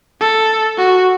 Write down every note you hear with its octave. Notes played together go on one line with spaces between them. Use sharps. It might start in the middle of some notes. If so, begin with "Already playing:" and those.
A4
F#4